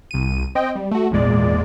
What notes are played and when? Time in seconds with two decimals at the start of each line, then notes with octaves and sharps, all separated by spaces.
0.11 C2 D#7
0.55 C4 D#5 G5
0.76 G3
0.91 A3 F#4
1.11 G#1 E2 A#2 G#3 D5